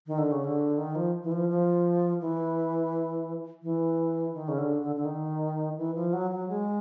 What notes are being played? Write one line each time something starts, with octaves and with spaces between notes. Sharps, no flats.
D#3
D3
C#3
D3
D#3
F3
E3
F3
F3
E3
E3
D#3
C#3
D3
D3
D3
D#3
E3
F3
F#3
F#3
G#3